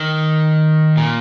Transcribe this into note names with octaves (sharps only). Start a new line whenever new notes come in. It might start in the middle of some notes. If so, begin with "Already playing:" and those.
Already playing: D#3
A#2